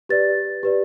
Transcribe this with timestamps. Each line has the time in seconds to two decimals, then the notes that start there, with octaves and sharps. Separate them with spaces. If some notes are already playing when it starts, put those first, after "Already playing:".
0.09 G4 B4 D5 A6
0.63 G4 B4 D5